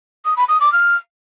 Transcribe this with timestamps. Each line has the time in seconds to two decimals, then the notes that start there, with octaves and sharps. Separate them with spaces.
0.24 D#6
0.36 B5
0.48 D#6
0.60 D6
0.72 F6